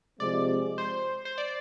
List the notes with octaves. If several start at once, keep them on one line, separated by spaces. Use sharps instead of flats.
C3 F3 G#3 C4 D5
C5
C5
D5